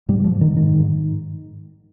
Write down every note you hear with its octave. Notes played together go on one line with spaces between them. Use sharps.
G#2 G3
G#2 F3
G#2 D#3
G#2 D#3
G#2